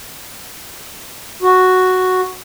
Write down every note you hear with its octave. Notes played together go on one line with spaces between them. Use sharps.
F#4